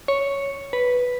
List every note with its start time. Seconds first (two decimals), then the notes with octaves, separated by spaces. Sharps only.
0.08 C#5
0.73 B4